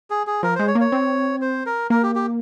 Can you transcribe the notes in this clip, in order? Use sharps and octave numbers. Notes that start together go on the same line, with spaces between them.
G#4
G#4
F3 A#4
G#3 C5
C#5
A#3
C#5
C4
C5
A#4
A#3 A#4
G4
G4